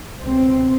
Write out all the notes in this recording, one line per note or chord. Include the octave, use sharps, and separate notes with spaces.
C#2 B2 C4